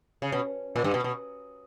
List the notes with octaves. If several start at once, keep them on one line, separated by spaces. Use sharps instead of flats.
C#3
B2
A#2
G2
B2
B2